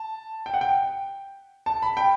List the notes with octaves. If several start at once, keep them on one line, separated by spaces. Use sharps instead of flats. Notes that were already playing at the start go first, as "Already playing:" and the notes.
Already playing: A5
G5
F#5
G5
A5
B5
G5